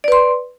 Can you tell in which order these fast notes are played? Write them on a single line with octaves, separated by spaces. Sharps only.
D5 B4 C6